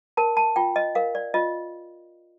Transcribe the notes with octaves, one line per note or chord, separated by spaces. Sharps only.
A#4 A5
A5
F4 G5
D#5
A#4 F5
D5
F4 D#5